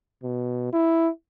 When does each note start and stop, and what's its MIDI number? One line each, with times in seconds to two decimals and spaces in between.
0.23 0.72 47
0.73 1.08 64